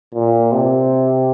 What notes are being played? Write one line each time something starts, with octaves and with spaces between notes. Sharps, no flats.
A#2
C3